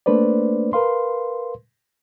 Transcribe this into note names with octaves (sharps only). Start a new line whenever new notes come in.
A3 A#3 D4 B4 C5 D5
A#4 B4 F5 C6